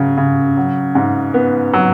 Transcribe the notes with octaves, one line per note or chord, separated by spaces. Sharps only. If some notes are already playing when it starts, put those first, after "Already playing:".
Already playing: C#3 F#3
C#3
F#3
G#2
B3
F#3